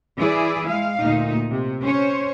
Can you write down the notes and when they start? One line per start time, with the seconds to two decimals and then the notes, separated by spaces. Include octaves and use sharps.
0.18 E3 E4 G#4 D5
0.68 G#3 F5
1.03 D2 A#2 D#4
1.51 C3
1.82 C#4 C5 C#5